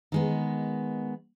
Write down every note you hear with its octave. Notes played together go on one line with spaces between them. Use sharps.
D#3 G#3 B3